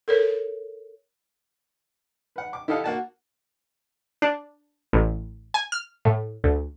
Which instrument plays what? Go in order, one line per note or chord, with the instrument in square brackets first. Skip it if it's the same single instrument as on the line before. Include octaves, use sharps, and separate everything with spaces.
[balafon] A4 A#4 C#5
[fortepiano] B4 F#5
D6
E4 G4 A4 D#5 F5 F#5
A#3 F#4 A5
[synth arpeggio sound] D4
A1
G#5
F6
A2
D2